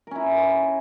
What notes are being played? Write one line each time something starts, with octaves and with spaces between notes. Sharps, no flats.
C#4 E4 A#4